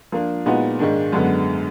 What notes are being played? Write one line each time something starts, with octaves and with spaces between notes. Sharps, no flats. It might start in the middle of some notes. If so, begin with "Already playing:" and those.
F3 A#3 D4
A#2 G#3 B3 D#4 F#4
G#2 D#3 G#3 D4
F#2 D3 G#3 B3